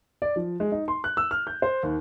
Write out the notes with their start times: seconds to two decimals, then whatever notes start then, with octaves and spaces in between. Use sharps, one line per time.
0.22 D5
0.36 F3
0.60 G#3
0.72 D#4
0.88 C6
1.04 F#6
1.17 E6
1.31 F6
1.47 G6
1.62 C5
1.83 D#2